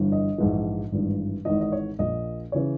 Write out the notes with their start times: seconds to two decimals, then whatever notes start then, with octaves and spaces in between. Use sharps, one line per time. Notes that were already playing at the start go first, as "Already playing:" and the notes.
Already playing: G1 G2 E3
0.12 D#5
0.38 A#1 G#2 E3
0.92 G#1 G2 E3
1.45 G#1 G#2 E3 D#5
1.61 D#5
1.72 C#5
1.99 A#1 A#2 D#5
2.52 C#3 E3 C#5